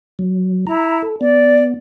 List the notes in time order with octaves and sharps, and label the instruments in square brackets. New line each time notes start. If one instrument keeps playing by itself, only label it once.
[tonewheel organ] F#3
[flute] E4 [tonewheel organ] A#5
[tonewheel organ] A4
[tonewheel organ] B3 [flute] D5